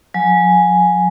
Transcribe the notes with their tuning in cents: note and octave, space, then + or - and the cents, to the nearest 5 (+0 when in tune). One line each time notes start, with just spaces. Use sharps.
F#3 -40 G#5 +0